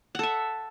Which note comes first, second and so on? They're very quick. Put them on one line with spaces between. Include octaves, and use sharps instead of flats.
F#5 A4 E5